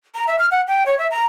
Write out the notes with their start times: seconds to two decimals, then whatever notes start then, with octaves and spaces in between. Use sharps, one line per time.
0.15 A#5
0.27 E5
0.39 F6
0.51 F#5
0.68 G5
0.86 C#5
0.99 E5
1.11 A#5